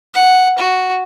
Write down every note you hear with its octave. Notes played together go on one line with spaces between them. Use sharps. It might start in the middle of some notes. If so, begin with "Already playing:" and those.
F#5
F#4